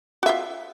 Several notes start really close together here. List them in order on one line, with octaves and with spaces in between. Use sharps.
F#4 E5 F4